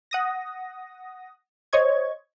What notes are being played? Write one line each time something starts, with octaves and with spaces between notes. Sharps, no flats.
F#5 D#6 A#6
C5 C#5 D#5 C#6 G#6